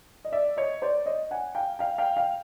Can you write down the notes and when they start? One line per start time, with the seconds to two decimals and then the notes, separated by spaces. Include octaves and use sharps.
0.25 D#5
0.32 D5 E5
0.57 C#5 D#5
0.82 C5 D5
1.06 C#5 D#5
1.31 F#5 G#5
1.55 F5 G5
1.79 F5 G5
1.98 F5 G5
2.17 F5 G5